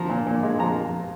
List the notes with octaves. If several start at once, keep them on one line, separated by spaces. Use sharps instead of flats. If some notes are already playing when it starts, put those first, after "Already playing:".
Already playing: F3 C4 A#5
A#2
A#2
G#3
F3 A#5